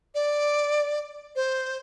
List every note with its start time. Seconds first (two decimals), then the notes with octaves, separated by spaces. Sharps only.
0.15 D5
1.36 C5